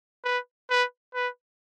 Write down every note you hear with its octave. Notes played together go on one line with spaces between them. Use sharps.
B4
B4
B4